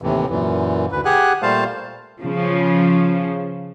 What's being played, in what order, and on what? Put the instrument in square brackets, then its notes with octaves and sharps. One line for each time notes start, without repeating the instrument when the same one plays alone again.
[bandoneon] D#2 A2 C3 E3
F#2 A#2 E3
D2 B4
G4 G#4 F#5 G#5 F#6
A#2 G3 A3 C5 F5 A5
[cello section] C#3 F3